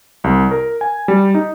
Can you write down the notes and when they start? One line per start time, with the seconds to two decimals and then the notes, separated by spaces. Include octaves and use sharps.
0.24 C2
0.51 A#4
0.81 G#5
1.08 G3
1.35 D#4